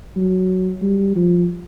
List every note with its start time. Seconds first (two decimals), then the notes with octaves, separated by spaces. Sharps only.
0.16 F#3
0.82 G3
1.16 F3